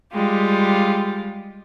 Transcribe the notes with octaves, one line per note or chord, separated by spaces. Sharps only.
G3 G#3 F4 G4